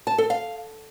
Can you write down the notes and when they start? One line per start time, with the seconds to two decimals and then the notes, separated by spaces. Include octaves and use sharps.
0.07 A5
0.18 A4
0.30 F5